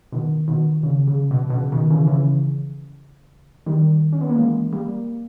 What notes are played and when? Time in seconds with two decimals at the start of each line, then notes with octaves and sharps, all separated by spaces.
0.12 B2 D#3
0.48 B2 D#3
0.83 C#3
1.08 C#3
1.31 B2
1.50 B2
1.54 C#3
1.72 B2 D#3
1.91 C#3 E3
2.07 C#3 E3
3.66 D#3 G3
4.13 C#4
4.21 B3
4.29 A#3
4.37 E3 G#3
4.73 G3 A#3